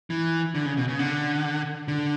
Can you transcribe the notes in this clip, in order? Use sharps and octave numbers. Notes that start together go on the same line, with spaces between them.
E3
D3
C#3
B2
C#3
D3
D3